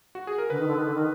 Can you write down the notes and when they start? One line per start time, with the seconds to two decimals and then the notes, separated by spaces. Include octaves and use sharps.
0.15 F#4
0.27 G#4
0.38 A#4
0.50 D3 B4
0.59 D#3
0.68 D3
0.76 D#3
0.85 D3
0.94 D#3